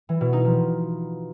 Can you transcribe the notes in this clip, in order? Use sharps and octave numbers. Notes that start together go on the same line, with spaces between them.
E3
B2
D#4
F3